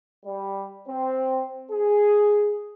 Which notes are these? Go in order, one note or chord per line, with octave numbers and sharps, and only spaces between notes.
G3
C4
G#4